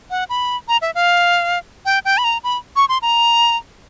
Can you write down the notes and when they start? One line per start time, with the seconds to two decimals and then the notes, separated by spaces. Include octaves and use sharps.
0.10 F#5
0.29 B5
0.68 A#5
0.82 E5
0.95 F5
1.85 G5
2.05 G5
2.18 B5
2.24 A#5
2.44 B5
2.76 C#6
2.89 C6
3.02 A#5